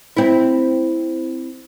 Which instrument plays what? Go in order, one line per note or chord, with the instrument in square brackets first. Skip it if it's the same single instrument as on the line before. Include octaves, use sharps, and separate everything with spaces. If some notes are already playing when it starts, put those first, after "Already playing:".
[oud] C4 E4